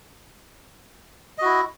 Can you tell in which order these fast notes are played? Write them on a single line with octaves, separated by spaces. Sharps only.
D#5 F#4 E4